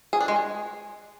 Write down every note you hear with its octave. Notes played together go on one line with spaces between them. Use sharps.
G#4
D4
G#3
G#4